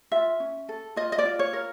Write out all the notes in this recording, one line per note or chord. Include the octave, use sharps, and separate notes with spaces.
F4 E5
C#4
A4
F4 D#5
D#5
D5
F4
C#5
A#4